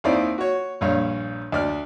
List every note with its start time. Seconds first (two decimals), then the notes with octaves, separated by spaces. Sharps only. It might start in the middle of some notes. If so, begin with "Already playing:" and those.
0.04 D#2 C4 D#4 E4 D5 F5
0.38 F#4 C#5
0.81 A#1 G2 C#5 F5
1.52 D2 D5 F6